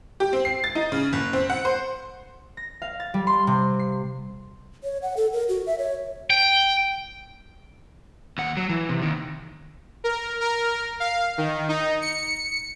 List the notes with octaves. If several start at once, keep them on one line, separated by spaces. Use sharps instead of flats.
G4
C4
C7
A6
D#4
C#3
F#1
C4
F#5
C5
A#6
F5
A6
G3
C6
C3
C7
C#5
F#5
A4
A#4
F#4
E5
C#5
G5
D#2 F#5
F#3
E3
C3
D#2 D#3
A#4
A#4
F5
D#3
D#4
C#7